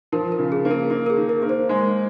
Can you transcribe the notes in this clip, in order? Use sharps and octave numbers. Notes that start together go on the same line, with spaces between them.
F3 A#4
A#4
C#3
G#4
A#3
A#4
A#3 A#4
A#4
G#4
D#3
A#4
A#3
C5
G#3